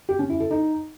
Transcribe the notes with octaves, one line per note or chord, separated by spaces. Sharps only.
G4
C#4
E4
A4
D#4